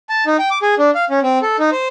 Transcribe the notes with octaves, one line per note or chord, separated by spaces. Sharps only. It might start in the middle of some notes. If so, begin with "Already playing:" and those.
A5
D#4
G5
D6
G#4
D4
F5
C#4
C4
A4
D#4
C5